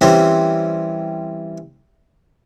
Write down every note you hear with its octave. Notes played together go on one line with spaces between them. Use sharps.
E3 G3 C4 C#4